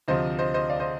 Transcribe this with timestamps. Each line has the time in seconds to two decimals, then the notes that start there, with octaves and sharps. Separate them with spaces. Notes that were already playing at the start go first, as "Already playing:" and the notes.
0.08 D2 C3 F3 C5 D#5
0.39 C5 D#5
0.54 C5 D#5
0.70 D5 F5
0.80 C5 D#5